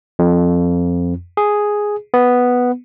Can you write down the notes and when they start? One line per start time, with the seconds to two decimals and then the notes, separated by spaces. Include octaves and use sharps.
0.19 F2
1.37 G#4
2.14 B3